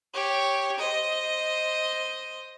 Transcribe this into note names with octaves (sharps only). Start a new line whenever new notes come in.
G4 C#5
C5 D#5